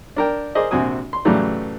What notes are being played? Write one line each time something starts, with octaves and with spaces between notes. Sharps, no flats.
D4 A#4 G5
G#4 A#4 C5 D5 D#5
A#1 C3 C4 F#4 G#5 D#6
C6
A2 C#3 E3 F#3 G3 A3